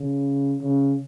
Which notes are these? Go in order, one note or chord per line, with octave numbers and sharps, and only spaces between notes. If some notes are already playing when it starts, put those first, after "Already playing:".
Already playing: C#3
C#3